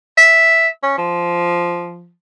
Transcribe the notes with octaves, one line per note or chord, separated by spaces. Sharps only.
E5
C#4
F3